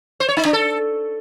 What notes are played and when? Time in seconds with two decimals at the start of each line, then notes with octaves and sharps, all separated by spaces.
0.20 C5
0.28 C#5
0.37 D#4
0.45 D4
0.53 A4